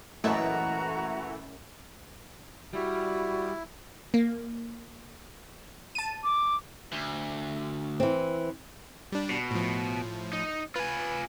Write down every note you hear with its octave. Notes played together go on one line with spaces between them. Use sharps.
F#2 A#2 E3 G#3 A3 E4 F#4 A#5
G3 E4 F#4
A#3
A5 D#7
D6
D2
E3 C4
G3 D4
B2
A2 F3
D#4
F4 B4 G#5